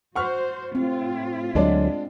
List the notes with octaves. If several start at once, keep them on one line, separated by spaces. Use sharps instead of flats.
F#4 C5 F#5 C#6 F6
A2 C4 F4
D2 F3 F#3 G#3 D4 D5